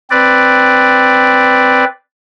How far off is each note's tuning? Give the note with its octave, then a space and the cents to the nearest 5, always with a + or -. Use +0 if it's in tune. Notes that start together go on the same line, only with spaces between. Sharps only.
C4 +0 B4 +0 D5 +0